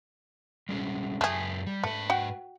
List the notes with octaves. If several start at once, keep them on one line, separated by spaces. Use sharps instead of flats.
G3 G#3 C#4
F#2 A3 G4 G#4 G#5
G3
G#2 A3 B4
F#4 G5